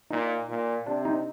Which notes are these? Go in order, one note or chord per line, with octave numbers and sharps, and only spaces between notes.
A#2 D#4
A#2
C3 D4
D#4